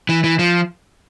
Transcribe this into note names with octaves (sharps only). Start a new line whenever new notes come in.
E3
E3
F3